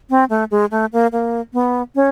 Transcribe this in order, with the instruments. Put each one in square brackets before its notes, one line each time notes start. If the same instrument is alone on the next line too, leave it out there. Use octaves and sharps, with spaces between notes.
[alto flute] C4
A3
G#3
A3
A#3
A#3
B3
C#4